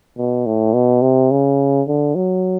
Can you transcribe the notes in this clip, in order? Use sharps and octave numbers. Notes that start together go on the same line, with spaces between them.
B2
A2
B2
C3
C#3
D3
F#3